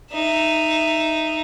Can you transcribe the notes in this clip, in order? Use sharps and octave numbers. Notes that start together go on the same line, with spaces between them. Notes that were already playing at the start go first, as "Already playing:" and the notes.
D#4 E5